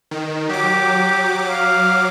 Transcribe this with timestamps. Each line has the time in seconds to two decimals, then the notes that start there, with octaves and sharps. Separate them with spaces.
0.11 D#3
0.49 F#3 G4 D6
1.50 F5